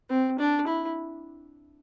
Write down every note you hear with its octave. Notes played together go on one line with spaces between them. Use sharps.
C4
D4
E4